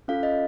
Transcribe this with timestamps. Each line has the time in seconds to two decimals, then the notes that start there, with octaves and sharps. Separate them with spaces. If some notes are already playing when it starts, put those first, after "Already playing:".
0.08 C#4 F4 A4 F5
0.23 D#5